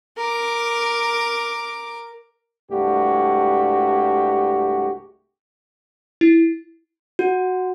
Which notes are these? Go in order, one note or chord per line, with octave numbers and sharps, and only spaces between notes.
A#4 D6
C2 G2 G#3 A3 F#4 G4
E4
F#4